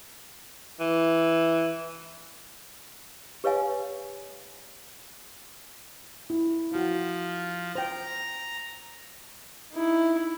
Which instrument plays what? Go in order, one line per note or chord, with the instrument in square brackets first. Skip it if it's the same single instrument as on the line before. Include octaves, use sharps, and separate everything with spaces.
[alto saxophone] E3
[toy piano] G4 B4 C#5 D#5 F5 G#5
[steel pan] E4
[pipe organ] F3 [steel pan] E4 F#4
[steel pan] C5 G5 [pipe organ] A#5
[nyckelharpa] D#4 E4